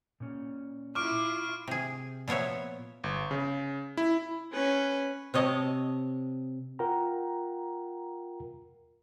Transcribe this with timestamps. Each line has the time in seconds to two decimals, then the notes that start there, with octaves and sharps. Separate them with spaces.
0.20 A#2 C#4
0.95 E4 F4 C#6 D6 F6 D7
1.68 C3 G#4
2.28 A#2 F3 B3 C#5 E5
3.04 G1
3.31 C#3
3.97 E4
4.53 C#4 B4
5.34 C3 C#5 D#5 A5
6.79 F4 A#4 F#5 G5 A#5